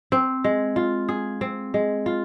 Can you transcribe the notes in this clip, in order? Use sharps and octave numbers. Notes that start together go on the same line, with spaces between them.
C4
G#3
F4
G#4
C4
G#3
F4